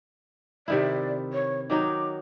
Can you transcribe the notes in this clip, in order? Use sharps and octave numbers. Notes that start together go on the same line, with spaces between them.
C3 D#3 E4 D5
C#5
D#3 F#3 D#4 D6